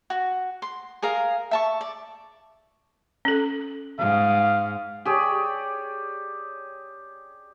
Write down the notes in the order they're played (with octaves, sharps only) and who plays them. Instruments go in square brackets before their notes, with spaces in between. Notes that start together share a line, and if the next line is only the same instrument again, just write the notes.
[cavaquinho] F#4
C6
G#4 A#4 F5
E5 A5 C#6
D5
[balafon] C#4 A4
[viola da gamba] G#2 [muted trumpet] F5
[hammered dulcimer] G4 G#4 C#5 D5